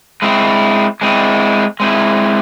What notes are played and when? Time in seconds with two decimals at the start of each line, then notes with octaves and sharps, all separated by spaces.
0.22 G#3 C4 E4
1.01 G#3 C4 E4
1.80 G#3 C4 E4